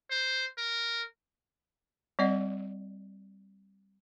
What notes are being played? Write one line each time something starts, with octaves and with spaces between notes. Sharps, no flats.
C5
A#4
G3 C4 D5 D#5 F#5